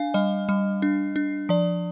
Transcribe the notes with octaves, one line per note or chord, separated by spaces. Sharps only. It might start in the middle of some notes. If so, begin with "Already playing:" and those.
Already playing: D4 F5 G#5
G3 D#5
G3
D4
D4
F3 D5